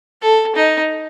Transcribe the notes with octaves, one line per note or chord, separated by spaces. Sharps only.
A4
D#4